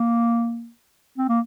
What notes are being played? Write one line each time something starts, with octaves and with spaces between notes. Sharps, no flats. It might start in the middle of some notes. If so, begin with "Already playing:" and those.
Already playing: A#3
C4
A#3